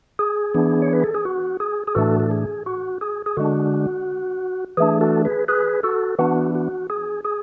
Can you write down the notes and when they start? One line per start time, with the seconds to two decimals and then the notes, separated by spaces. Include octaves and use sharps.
0.19 G#4
0.54 E3 B3 D4
0.82 C#5
0.93 B4
1.04 A4
1.15 G#4
1.25 F#4
1.60 G#4
1.87 G#4
1.95 A2 E3 A3 D4 F#4 A4
2.20 A4
2.31 G#4
2.66 F#4
3.01 G#4
3.26 G#4
3.37 D3 G#3 D4 F#4
4.77 E3 A3 D4 G#4
5.01 F#4 A4
5.25 G#4 B4
5.48 G#4 B4
5.83 F#4 A4
6.19 E3 B3 D4 F#4
6.55 F#4
6.90 G#4
7.25 G#4